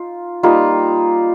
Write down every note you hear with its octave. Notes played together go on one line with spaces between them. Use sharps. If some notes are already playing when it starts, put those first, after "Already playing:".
Already playing: D#4 F4
G3 A#3 D#4 F4